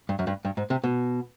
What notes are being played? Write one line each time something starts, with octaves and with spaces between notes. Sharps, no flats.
G2
F#2
G2
G2
G#2
C3
B2